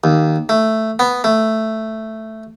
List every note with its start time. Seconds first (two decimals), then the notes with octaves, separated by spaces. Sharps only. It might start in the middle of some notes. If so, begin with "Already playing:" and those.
0.04 D#2
0.49 A3
0.99 B3
1.24 A3